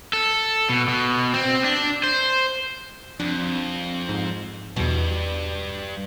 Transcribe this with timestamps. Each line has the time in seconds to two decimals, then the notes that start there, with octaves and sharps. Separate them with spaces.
0.13 A4
0.69 B2
0.88 B2
1.34 C4
1.64 D4
2.04 C5
3.20 F2 D4
4.09 G#2
4.77 E2 G2 B2